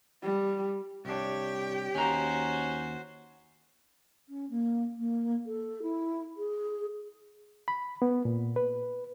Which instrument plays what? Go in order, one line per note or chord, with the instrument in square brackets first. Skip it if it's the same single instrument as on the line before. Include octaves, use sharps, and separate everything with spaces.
[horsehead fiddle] G3
[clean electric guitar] C2 D4 [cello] G4 G5 [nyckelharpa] C#5
[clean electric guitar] D#2 A#5 [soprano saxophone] C#4 [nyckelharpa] F#4 C5
[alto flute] C#4
A#3
A#3
A4
E4
G#4
[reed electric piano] B5
B3
A#2
B4